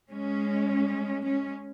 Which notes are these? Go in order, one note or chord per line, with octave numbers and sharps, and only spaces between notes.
G#3 C#4
G#3 C#4